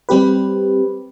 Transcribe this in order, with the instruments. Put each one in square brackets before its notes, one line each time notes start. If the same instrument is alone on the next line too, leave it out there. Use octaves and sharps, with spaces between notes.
[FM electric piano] G3 C4 G4 B4